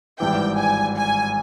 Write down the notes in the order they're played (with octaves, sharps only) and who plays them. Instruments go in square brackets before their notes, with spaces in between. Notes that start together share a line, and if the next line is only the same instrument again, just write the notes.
[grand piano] G#1 G2 E3 [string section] G5
[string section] G#5
G#5